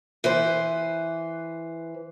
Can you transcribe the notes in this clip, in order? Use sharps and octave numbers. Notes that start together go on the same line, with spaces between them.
E3 B4 C5